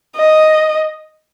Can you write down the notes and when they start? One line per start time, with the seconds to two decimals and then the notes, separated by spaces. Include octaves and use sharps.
0.16 D#5